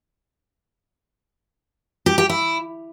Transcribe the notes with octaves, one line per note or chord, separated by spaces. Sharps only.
G4
G4
E4